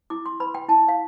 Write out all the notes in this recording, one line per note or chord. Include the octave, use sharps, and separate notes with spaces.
E4 D6
C6
B4 B5
G5
E4 A5
F5